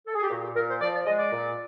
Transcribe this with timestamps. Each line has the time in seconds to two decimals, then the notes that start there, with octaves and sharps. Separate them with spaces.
0.07 A4
0.15 G#4
0.23 G4
0.30 A#2 F#4
0.43 G4
0.56 A#2 A#4
0.69 C5
0.81 F3 D5
0.94 D5
1.06 G#3 D#5
1.18 D5
1.31 A#2